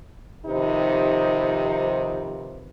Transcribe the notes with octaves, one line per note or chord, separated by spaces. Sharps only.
C3 D#3 F3 D#4 G4 B4